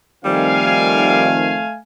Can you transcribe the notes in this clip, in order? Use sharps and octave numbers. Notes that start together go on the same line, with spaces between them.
D#3 F3 G3 A3 C4 F5 G#5